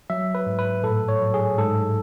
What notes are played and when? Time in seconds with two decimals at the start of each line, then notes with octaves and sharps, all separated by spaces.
0.10 F#3 E5
0.35 B4
0.46 G#2
0.59 B4
0.84 A2 A4
1.09 C#5
1.21 F#3
1.34 G#4
1.58 G#2 A4